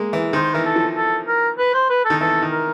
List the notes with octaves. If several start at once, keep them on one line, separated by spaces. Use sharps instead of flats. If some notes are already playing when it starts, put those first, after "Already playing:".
Already playing: G#3 A#3
E3
D#3 C5
E3 A#4
A4
F3
A4
A#4
B4
C5
B4
A4
D#3
E3 A4
D#3
A#4